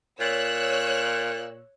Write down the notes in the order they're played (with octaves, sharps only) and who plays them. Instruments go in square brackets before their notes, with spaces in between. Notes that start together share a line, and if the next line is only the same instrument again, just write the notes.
[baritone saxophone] A#2 [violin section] C#5 E6 F#6